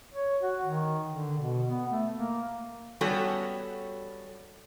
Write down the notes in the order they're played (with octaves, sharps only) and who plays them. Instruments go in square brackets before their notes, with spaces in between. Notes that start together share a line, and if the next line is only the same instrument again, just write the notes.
[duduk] C#5
F#4
D#3
D3
B2
B3
A3
A#3
[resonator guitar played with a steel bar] G3 B3 C#4 F#4 A4